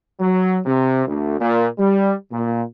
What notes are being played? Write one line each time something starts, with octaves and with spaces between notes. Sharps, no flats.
F#3
C3
D2
A#2
G3
A#2